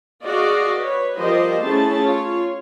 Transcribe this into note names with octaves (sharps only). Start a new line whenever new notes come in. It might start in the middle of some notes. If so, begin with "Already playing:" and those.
F#4 G#4 D5 D#5 F5
B4 C#5
F3 G3 G4 A#4 C5 D#5
A3 C#4 E4 G#4 A5
F4 C#5